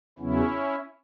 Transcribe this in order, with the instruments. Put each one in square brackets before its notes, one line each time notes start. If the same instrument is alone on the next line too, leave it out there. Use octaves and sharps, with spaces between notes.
[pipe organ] E2 C#3 F#3 B3 C#4 E4